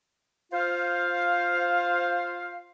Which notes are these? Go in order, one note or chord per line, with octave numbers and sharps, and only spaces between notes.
F4 C5 F5